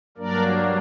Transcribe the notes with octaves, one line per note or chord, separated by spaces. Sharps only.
G2 F#3 A#3 D4 A#4 D5